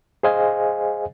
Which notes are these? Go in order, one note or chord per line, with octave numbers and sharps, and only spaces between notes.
G#4 C5 D#5 F5 G#5